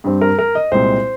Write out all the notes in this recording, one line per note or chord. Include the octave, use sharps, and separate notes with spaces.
G2 G3 C4
A#4
A#4
D#5
C2 A#2 G#3 C4 C5